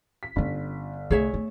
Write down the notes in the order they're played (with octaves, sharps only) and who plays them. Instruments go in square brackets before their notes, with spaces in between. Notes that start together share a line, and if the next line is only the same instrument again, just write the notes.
[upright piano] B6
[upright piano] G1 [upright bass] C#4 F4
[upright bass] C2 A3 [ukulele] G#4 C#5 E5
[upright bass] A3